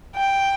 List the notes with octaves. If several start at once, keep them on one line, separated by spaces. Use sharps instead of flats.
G5